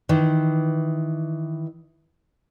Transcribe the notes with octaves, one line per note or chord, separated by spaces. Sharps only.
D#3 E3